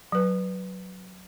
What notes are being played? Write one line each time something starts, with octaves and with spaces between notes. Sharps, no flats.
F#3 B4